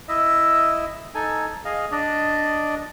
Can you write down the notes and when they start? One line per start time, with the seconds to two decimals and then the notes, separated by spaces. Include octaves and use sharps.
0.08 E4 D#5 E5
1.15 D#4 A4 G#5
1.65 G#4 D#5 F5
1.92 D4 D5 D#5